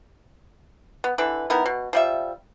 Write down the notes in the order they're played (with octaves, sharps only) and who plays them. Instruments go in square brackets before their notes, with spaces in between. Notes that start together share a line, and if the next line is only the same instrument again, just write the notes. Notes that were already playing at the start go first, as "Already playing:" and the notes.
[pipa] B3
D3 E3 B4
D#3 B3 E4 A#4
B2
F3 G3 E5